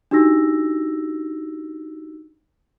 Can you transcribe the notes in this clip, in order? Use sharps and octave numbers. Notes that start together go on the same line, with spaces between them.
D4 D#4 F#4 G4 E6 A#6